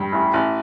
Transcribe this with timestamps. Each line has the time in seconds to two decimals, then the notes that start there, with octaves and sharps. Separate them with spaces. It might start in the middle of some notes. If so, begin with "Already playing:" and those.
Already playing: G2
0.12 A1
0.34 A1